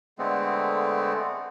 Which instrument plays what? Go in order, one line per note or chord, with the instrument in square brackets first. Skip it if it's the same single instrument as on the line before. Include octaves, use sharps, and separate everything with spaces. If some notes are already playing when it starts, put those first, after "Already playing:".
[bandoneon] D3 G#3 A3 B3 C4